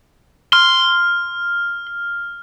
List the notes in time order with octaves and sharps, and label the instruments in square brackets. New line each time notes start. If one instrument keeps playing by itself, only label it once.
[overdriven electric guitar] C6 [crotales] F6